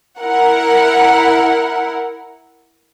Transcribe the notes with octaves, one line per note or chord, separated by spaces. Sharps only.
E4 A#4 F#5